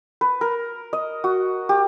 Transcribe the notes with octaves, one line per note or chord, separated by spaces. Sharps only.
B4
A#4
D#5
F#4
G4